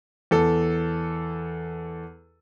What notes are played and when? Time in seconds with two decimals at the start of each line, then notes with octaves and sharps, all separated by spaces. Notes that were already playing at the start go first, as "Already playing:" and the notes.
0.31 E2 A4